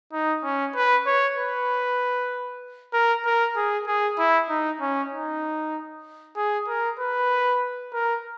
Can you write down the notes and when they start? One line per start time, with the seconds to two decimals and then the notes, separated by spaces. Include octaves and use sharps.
0.13 D#4
0.44 C#4
0.76 B4
1.06 C#5
1.38 B4
2.93 A#4
3.25 A#4
3.56 G#4
3.87 G#4
4.18 E4
4.49 D#4
4.81 C#4
5.13 D#4
6.37 G#4
6.68 A#4
7.00 B4
7.94 A#4